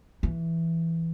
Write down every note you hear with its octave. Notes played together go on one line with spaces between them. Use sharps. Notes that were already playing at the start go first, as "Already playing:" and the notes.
E3